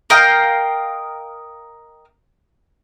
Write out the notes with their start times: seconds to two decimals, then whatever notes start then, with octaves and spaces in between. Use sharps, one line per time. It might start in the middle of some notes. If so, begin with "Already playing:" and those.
0.10 A#4 D#5 F5 G5